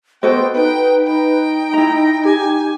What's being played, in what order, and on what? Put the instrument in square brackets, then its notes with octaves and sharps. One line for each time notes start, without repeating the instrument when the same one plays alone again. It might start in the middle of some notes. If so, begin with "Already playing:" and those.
[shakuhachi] B3 [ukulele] F#4 A4 D#5 [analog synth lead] C5 [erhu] G5
[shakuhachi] D#4 [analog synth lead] B4 [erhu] G5
[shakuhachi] D#4 [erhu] G5
[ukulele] E4 A#5 [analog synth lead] A#6
[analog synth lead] G4 [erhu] G#5